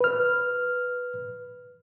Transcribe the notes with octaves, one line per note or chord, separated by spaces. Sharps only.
B4 F6